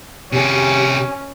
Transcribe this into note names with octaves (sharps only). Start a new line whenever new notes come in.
C3 C#4 G4 G#4